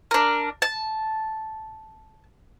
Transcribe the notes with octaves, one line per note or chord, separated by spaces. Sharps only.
D4 A#4
A5